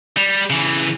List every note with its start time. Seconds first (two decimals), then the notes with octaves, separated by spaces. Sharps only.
0.17 G3
0.50 C#3 E3